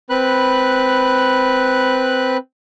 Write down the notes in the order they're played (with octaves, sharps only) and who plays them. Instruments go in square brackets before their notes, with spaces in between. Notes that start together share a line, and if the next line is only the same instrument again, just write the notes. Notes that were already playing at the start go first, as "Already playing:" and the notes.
[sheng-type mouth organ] C4 B4 B5 F#6